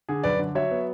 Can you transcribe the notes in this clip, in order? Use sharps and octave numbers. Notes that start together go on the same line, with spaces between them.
D3 G#4
F#2 B4 D5
D3
F#3 C#5 E5
B3